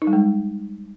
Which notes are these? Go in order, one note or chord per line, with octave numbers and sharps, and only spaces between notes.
D#4
G3
G#3